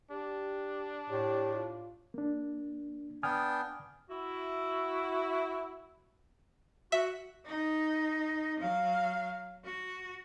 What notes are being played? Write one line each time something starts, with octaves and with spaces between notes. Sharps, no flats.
D4 G4
A2 G4
F4
A#3 D4
B3 D4 G5 G#5 D#6 F6
E4 F#4
F#4 E5
D#4
F#3 F5
F#4